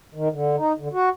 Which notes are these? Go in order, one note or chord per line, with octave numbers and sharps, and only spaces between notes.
D#3
D3
D#4
D3
F#4